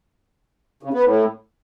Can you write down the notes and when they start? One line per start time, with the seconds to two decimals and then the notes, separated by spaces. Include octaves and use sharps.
0.83 C#3
0.94 B3
1.04 A2